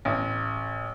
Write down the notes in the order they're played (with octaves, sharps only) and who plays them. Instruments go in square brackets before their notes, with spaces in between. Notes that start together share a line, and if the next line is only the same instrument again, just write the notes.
[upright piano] A1